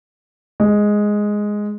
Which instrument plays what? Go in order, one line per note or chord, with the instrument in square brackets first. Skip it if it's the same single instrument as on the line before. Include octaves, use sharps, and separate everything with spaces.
[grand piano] G#3